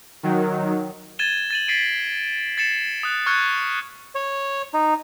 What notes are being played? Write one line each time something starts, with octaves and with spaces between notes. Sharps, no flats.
D#3 F#3
G#6 A6 D#7 E7 G7
A6 D#7 F#7
A6 B6 C7 D7 D#7
A6 C7 C#7 E7
D#6 F#6
C#6 F6 F#6 G#6 C#7
C#5
D#4